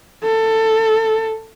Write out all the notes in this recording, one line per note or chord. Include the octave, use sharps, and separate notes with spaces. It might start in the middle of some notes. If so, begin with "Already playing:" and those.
A4